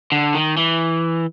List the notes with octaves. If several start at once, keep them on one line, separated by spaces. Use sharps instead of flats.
D3
D#3
E3